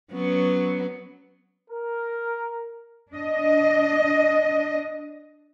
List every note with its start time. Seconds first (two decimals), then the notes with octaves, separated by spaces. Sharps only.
0.12 F#3 B3 C#4
1.68 A#4
3.13 D4 D#5